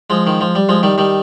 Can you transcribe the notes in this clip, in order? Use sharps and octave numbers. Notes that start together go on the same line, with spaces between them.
F3 G#3
D#3
F3
G3
F3 G#3
D#3 G3
D#3 G3